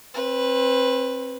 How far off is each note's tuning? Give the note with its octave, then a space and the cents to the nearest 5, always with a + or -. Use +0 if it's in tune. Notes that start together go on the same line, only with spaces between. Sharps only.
C4 +30 B4 +0